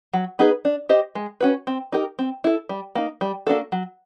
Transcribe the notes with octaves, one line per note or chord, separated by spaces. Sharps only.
F#3
B3 D#4 G#4 B4
D4
G4 C5 D#5
G#3
C#4 F#4 B4
C4
D#4 G4 A#4
C4
E4 A4
G3
A#3 D#4
G3
A#3 D4 F#4 A4
F#3